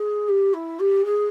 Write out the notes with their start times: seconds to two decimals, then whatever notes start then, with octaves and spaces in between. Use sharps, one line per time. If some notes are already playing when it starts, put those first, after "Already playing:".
Already playing: G#4
0.28 G4
0.54 E4
0.79 G4
1.05 G#4